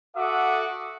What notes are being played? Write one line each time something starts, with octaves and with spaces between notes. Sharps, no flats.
F#4 A4 E5 F#5 D6 D#6